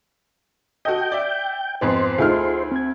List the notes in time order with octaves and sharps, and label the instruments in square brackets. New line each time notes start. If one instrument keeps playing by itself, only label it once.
[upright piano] F#4 A4 D#5 [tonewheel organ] G5
[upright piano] D5 E5
[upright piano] F2 G#2 B3 [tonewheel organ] C5
[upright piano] D2 A3 F6 [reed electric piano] D#4 F4 G#4
[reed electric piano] C4 G#6